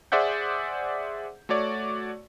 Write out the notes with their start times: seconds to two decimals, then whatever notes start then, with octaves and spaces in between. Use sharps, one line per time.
0.12 G#4 C5 D5 E5 F#5 G6
1.49 A3 F#4 C#5 D5